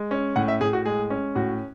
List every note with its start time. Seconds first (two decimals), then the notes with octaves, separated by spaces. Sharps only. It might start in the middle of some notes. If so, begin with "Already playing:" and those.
Already playing: G#3
0.11 C#4
0.36 A2 F#5
0.48 E5
0.61 A2 G#4
0.73 F#4
0.85 G#3 G#4
1.10 C#4
1.35 A2 F#4